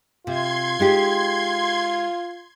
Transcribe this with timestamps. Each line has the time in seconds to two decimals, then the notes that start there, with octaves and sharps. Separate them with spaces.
0.27 C3 F4 C6 G#6
0.80 G#3 D#4 G4